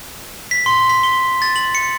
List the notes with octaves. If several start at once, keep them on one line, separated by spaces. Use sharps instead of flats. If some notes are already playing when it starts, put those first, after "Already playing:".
B6
C6
B6
G7
A6
F#7
C#7